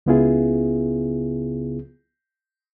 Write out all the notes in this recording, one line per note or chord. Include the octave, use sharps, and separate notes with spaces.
C#2 C#3 B3 E4 F4 G#4